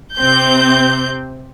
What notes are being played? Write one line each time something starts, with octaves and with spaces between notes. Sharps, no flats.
C3 C4 G6